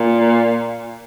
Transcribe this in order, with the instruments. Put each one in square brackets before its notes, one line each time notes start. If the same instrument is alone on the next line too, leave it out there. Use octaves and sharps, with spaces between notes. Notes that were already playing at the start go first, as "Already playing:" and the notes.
Already playing: [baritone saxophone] A#2